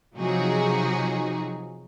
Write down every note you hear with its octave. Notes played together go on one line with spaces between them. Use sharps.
C3 F3 F#3 D#4 F#4 G#4